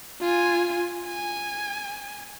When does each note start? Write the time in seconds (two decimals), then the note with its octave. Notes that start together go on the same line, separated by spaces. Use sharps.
0.21 F4 G#5
1.07 G#5